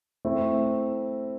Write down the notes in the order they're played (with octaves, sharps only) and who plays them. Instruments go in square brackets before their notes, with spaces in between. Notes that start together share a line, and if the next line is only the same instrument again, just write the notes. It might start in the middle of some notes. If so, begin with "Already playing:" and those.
[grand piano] A3 C4 E4